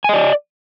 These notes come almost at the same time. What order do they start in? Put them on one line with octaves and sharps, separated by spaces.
G#5 D#5 D5